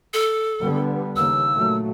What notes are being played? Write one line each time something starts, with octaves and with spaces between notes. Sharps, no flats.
A4
D3 G3 B3
D#2 C#3 A#3 E6
A#2 F#3 A3